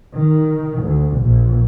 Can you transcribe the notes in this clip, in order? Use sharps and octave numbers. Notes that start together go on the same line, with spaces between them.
D#3
D2
A#1